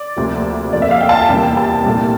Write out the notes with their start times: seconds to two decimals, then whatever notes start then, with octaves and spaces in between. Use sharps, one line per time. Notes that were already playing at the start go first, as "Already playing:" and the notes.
Already playing: D5
0.17 D2 C3 F3 A#3
0.73 F2 D3 F3 A#3 D4 D5
0.82 E5
0.91 F5
1.00 G5
1.09 A5
1.19 G5
1.29 E2 C3 G3 A#3
1.57 A5
1.84 C2 A#2 A3